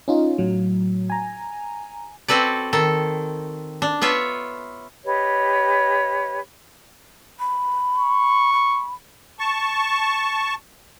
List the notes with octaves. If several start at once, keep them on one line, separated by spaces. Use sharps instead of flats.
C#4 D#4 F4
A2 F#3
G#5 A#5
C4 F#4 A4 B4 D5
D#3 A4
D4
B3 F4 C#5 E5
G4 B4 C#5 D#5
B5
C#6
B5
A5 C#6